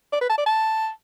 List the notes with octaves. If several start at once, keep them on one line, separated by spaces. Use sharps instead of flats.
D5
B4
A5
D5
A5